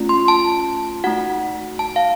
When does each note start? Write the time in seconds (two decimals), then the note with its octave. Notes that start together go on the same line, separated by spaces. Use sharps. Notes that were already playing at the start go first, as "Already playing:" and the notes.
Already playing: A3 C#4 F4
0.09 C6
0.28 A5
1.04 A3 D#4 F#4 F#5
1.79 A5
1.96 F5